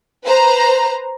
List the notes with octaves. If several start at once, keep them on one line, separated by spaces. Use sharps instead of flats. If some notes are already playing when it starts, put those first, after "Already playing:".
B4 C5 A#5